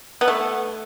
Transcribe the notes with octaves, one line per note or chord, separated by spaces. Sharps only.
B3
A3